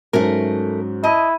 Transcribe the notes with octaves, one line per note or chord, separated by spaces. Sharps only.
G#2 F#3 A3 C#4 A#4
E4 D#5 A5 D#7